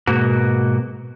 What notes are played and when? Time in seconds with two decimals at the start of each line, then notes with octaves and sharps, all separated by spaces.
0.07 G#2 B2 A#3 F#4